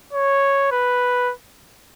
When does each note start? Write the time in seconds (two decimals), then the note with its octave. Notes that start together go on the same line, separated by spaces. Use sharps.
0.13 C#5
0.72 B4